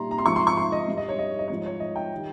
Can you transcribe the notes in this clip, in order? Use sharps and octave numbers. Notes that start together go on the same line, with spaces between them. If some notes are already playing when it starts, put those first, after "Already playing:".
Already playing: A#2 G3 A#5 C6
A#5
C6
G#2 F3 C#6
C6
C#6
C6
D#5
G2 G3
D#5
C#5
D#5
D#5
G#2 F3 C#5
C#5
D#5
G5
D#3 G3